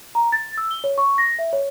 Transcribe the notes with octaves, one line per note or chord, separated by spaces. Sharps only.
A#5
A6
E6
G7
C#5
C#6
A#6
E5
C#5